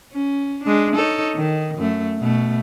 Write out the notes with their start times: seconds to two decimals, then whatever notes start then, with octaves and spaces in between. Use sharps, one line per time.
0.13 C#4
0.64 G#3 D4
0.95 D#4 A4 C#5
1.35 D#3
1.78 F#2 A3
2.20 B2 A3